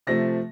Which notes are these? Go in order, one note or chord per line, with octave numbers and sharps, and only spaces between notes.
C3 F3 A3 A#6